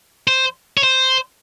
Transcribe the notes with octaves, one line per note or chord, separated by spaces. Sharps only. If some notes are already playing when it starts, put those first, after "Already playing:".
C5
C#5
C5